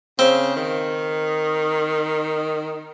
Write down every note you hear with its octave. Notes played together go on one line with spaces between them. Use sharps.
C#3 C4
D#3